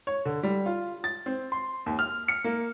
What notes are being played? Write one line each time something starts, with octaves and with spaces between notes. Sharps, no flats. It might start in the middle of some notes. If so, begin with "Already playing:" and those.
C#5
D3
G3
F4
A6
C4
C6
D#2
F6
C#7
A#3